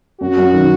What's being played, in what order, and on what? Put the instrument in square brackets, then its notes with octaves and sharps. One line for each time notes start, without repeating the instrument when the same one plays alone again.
[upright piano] F#2 [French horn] F#4
[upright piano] F#2
D#3